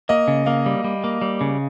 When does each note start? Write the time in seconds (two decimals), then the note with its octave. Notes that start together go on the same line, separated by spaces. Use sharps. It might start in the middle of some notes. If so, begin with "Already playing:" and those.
0.09 A#3 D#5
0.28 C#3
0.46 A#3 F5
0.66 G3
0.84 G3
1.04 A#3
1.22 G3
1.41 C#3